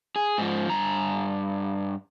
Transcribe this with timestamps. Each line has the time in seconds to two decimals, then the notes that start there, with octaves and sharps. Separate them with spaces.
0.16 G#4
0.38 G#2 F3
0.69 G2 A#5